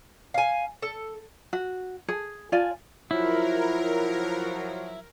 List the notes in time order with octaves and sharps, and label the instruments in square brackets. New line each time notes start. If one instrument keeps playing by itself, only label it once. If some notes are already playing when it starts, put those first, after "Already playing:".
[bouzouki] F5 G#5
A4
[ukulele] F#4
G#4
F4 D5 G#5
[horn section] F3 F#3 [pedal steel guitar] E4 [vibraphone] F4 B5 [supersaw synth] A#4